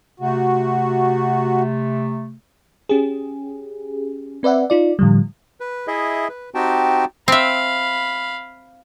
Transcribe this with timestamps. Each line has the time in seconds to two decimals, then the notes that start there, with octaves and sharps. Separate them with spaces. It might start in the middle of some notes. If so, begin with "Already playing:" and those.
0.20 C3 A3 F#4
2.89 C#4 G4 G#4
4.43 C4 B4 D5 E5 F#5
4.70 D#4 F4 D5
4.99 A2 D3 F3 G3
5.60 B4
5.87 E4 G#4 D#5 E5
6.29 B4
6.55 C4 D#4 F#4 G4 G5 A5
7.28 C4 E5 F5 B5